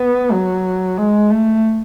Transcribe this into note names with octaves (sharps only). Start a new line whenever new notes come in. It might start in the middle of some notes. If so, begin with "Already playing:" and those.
Already playing: B3
F#3
G#3
A3